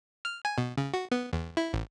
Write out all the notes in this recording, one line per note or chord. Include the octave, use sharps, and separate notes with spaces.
F6
G#5
B2
C#3
F#4
B3
E2
E4
A1